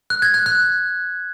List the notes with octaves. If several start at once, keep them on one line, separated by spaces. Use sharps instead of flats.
F#6
G#6
F#6
F#6